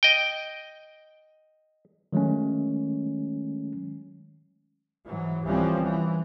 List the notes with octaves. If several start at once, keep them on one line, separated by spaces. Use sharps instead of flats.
D#5 G5
D#3 F#3 G#3 A3 C#4
G#2 E3 F#3
C2 E3 F3 G3 C4 C#4
E3